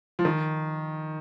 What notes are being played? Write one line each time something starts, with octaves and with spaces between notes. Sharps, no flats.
F3
D#3